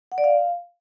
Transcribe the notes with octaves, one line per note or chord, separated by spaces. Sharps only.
F#5
D5
F5